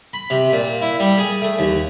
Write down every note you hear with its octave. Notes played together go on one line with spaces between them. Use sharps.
B5
C3
A#2
E4
G3
G#4
A3
D#2